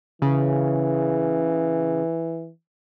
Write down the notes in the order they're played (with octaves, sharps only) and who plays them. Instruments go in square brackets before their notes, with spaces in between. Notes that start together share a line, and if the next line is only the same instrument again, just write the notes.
[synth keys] C#3 [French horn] E3